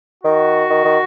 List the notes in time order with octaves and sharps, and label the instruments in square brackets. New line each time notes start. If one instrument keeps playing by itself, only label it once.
[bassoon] D#3 [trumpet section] F#4
[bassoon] D#3
D#3